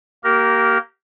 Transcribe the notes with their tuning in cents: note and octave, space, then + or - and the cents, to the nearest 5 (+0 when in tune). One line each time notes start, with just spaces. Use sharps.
A#3 +0 G4 -25 A#4 +0